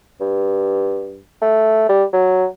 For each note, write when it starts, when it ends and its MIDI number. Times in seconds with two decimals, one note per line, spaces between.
0.21 1.20 43
1.42 1.88 57
1.89 2.04 55
2.13 2.46 54